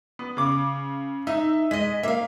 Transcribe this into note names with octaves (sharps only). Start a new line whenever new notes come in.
B3
C#3 D6
D#4 E5
G#3 D#5 B6
A#3 E5 F5